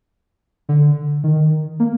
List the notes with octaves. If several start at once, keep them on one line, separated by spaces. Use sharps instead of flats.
D3
D#3
A#3